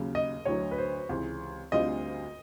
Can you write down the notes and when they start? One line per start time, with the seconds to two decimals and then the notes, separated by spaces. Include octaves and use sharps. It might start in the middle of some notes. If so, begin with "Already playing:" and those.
Already playing: D#2 C#3 F#3
0.15 D#5
0.45 D2 D3 F#3 C#5
0.71 B4
0.78 C5
1.09 C#2 C3 E3
1.72 D2 D3 G3 C4 F4 D#5